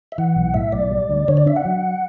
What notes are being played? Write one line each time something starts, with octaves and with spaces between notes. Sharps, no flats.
E5
E3 F#5
B1
A2 E5
B1 D5
G3
D2
D3 C#5
D5
D4 E5
F#5
F#3